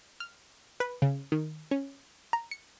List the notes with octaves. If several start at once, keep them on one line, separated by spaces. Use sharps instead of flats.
F6
B4
C#3
D#3
C#4
A#5
C#7